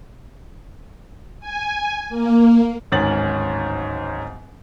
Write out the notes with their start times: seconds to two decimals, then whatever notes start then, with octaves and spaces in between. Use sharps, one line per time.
1.40 G#5
2.09 A#3
2.92 D1 G#2 D#3 C#4 A6 F#7